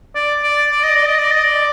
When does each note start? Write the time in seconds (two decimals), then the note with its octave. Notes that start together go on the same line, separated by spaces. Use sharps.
0.15 D5
0.43 D5
0.72 D5
0.84 D#5
0.96 D5
1.07 D#5
1.19 D5
1.31 D#5
1.45 D5